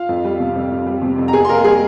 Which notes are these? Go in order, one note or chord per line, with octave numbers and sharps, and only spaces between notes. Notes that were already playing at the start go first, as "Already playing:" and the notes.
Already playing: F4 F5
F2
G3
C3
F2
F2
G3
C3
F2
A#5
C3 G#4 G#5
C6
A#3 A#4 A#5
G3 G#4 G#5